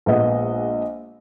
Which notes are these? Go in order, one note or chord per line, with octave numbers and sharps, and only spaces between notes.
A#1 G#3 B3 D#5 F#5